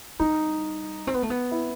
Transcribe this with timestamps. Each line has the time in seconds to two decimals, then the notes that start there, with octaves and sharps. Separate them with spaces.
0.20 G3 D#4
1.07 C4
1.14 B3
1.23 A3
1.30 B3
1.51 E4